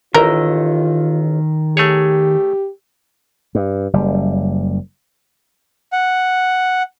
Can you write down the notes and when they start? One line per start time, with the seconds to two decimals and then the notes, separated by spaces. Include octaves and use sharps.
0.14 A1 D#3 F4 A#4 D#5 E6
1.77 A3 G4 G#4 C#5
3.55 G2
3.93 F#1 G3
5.93 F#5